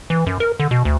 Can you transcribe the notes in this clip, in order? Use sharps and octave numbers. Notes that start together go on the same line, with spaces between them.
E3
F#2
A#4
D3
B2
D2